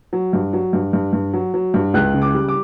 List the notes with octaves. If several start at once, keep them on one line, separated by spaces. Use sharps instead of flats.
F#3
G2
F#3
G2
G2
G2
F#3
F#3
G2
C#2 F#6
C#3
D6
G3
D6